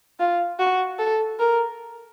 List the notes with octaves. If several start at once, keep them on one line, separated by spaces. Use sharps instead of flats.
F4
F#4
A4
A#4